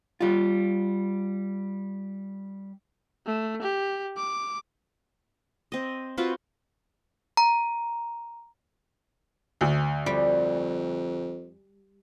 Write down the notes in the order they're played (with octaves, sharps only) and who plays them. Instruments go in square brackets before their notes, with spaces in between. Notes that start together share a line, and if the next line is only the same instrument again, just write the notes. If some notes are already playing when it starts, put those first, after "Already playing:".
[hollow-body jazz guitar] G3 F4
[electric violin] A3
G4
D6
[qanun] C4 D#5
C4 F4 F#4 B4
[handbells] A#5
[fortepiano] D2
[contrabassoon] F2 [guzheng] G3